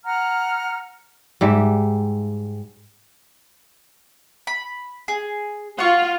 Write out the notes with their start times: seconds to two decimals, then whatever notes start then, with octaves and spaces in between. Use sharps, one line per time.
0.04 F#5 A#5 F6
1.41 G#2 G3 E5
4.47 B5
5.08 G#4
5.79 F4 F#5 C#6